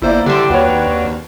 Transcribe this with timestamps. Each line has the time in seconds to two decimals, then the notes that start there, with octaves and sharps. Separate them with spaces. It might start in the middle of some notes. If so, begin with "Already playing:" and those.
0.02 G1 A#3 E4 C5 D5
0.26 D3 G3 C4 D4 G4
0.50 D#2 F#4 B4 C#5